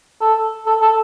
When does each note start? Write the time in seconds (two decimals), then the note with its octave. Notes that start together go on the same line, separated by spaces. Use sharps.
0.21 A4
0.66 A4
0.82 A4